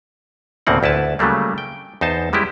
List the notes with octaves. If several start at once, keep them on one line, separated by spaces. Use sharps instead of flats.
D2 A2 C#3 A#3 C4 F#5
D2 E4 B4 A5
C#3 F#3 G3 A3 A#3
G5
E2 D#4 C5 A5
G3 G#3 C#4 E4 G4